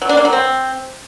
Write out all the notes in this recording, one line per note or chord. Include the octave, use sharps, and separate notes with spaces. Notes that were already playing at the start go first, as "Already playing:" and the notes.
F#3
D4
A#3
F#3
C4